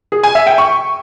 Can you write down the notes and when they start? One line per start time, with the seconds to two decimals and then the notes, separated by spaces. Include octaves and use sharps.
0.12 G#4
0.24 G#5
0.35 E5
0.47 G5
0.58 C#6